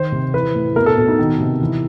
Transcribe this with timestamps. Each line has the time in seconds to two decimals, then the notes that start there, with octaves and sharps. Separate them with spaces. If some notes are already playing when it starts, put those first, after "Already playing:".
Already playing: D#3 C5
0.12 C3
0.34 E3 B4
0.55 A2
0.76 B2 A#4
0.86 A4
0.98 B2
1.08 D#4
1.19 D#3
1.40 C3
1.61 E3